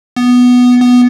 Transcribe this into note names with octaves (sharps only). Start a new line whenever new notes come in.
B3
B3